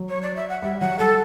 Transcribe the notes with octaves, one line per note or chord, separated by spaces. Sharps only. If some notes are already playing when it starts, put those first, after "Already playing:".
Already playing: F#3
C#5
D5
E5
F#5
G3 E5
F#3 F#5
G3 A4